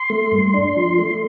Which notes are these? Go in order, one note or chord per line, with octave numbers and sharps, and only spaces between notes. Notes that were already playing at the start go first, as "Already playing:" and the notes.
Already playing: C6
A3
G2
D4
F3
A3